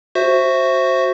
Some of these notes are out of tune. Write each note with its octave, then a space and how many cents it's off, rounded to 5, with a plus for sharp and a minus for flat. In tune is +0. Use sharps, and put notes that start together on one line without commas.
F#4 +0 C5 +10 E5 +0